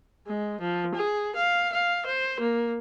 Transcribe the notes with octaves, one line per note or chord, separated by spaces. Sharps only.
G#3
F3
G#4
F5
F5
C5
A#3